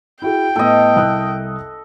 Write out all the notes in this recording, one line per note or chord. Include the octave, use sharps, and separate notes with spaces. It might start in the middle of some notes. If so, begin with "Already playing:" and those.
E4 F#4 G#4 G5
A2 B3 A4 D#5
C2 D#6 F#6